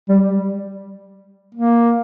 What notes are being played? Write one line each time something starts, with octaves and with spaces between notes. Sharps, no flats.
G3
A#3